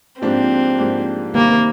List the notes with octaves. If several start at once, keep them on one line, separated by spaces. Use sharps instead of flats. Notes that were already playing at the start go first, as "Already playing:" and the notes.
G#2 F3 A#3 C4 D4 G4
G#2 F3 A#3 D4 G4
C3 D#3 G3 A#3 C4